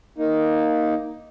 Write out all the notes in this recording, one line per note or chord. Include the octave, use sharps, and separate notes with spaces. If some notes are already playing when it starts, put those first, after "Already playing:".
A#3 D#4